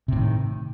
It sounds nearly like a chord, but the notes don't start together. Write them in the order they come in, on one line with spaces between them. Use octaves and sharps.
C3 A2 D#3